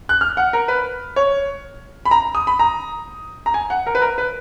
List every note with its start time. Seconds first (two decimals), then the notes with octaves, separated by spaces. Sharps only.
0.09 F#6
0.21 F6
0.37 F#5
0.53 A#4
0.68 B4
1.16 C#5
2.05 B5
2.11 A#5
2.35 D#6
2.47 B5
2.59 A#5
3.46 A#5
3.54 G#5
3.70 F#5
3.86 A#4
3.95 B4
4.02 A#4
4.18 B4